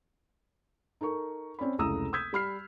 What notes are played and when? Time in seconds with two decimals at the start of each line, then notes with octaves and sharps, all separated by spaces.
1.01 D#4 A4 A#4 C#6
1.59 C4 C#4 D5 B5
1.78 F1 C#2 E4 A#5 D#6 E6
2.13 D#6 E6 G6 G#6 B6
2.33 G3 B5 F6 C7